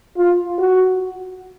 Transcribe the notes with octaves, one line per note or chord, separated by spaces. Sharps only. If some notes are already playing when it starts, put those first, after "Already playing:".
F4
F#4